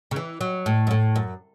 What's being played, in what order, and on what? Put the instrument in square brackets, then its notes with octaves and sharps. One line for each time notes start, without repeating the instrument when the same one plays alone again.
[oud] C#3
E3
F#3
A2
F#2
A2
F#2